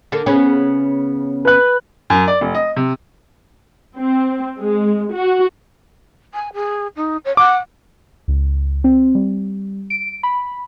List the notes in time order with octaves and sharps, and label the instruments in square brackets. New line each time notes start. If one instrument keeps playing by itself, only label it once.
[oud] D3 A#3 A4
C#3 B3 C#4
[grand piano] B4 F#6
[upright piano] F#2
D5
F1
D#5
C3
[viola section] C4
G#3
F#4
[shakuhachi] G#5
G#4
D#4
C#5
[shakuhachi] F#5 [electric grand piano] D6
[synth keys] C#2
C4
G3
D7
B5